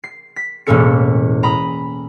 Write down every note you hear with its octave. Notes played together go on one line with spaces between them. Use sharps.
C7
B6
E1 A2 A#3 C#4 A4 C#7
A#5 B5 D#6